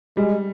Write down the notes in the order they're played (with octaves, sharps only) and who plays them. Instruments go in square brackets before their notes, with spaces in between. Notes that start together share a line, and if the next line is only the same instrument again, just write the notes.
[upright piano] G3 [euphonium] G#3